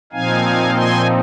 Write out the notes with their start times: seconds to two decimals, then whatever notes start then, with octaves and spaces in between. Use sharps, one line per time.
0.13 A#2 F3 C4 D#4 F5 G#5
0.75 G#5 C6